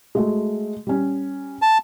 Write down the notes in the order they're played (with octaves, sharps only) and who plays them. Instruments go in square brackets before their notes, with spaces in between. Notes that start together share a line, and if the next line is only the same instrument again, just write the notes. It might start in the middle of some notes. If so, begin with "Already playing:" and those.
[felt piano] G#3 A3 F#4
G3 C#4
[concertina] A5